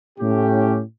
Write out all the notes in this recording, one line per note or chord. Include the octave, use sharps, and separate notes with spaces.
A2 C#4 G4